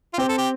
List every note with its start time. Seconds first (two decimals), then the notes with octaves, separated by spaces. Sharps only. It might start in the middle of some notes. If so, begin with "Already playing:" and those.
0.13 F4
0.18 C4 G4
0.29 A4
0.38 G4